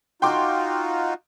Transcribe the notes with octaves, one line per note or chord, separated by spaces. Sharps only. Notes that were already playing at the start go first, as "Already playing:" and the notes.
D#4 F4 F#4 G5 C6 D6